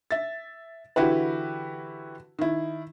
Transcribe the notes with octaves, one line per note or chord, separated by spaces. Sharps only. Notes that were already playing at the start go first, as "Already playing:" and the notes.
E5 A6
D3 E3 E4 F#4 G4 B4
D#3 E4